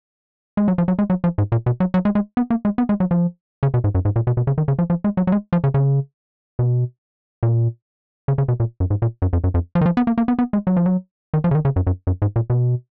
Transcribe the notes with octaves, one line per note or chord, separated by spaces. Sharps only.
G#3
F#3
F3
F#3
G#3
F#3
F3
G#2
A#2
B2
F#3
F#3
G#3
G#3
B3
A#3
G#3
B3
G#3
F#3
F3
C#3
B2
G#2
F#2
G#2
A#2
B2
B2
C#3
D#3
C#3
F3
F3
G#3
F#3
F#3
G#3
F3
C#3
C#3
B2
A#2
C#3
C#3
B2
A#2
F#2
G#2
A#2
F#2
F2
F#2
F2
F3
D#3
F3
B3
A#3
A#3
B3
B3
G#3
F#3
F3
F#3
D#3
F3
C#3
D#3
C#3
F#2
F#2
F#2
G#2
A#2
B2